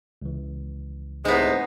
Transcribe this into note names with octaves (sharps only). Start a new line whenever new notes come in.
C#2 E3
A2 C3 G#3 B3 D#4 C5